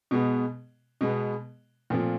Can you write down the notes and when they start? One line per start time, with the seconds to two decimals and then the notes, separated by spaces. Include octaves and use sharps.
0.11 B2 G#3 B3
1.01 B2 G#3 B3
1.90 A#2 F3 A3 C4 F4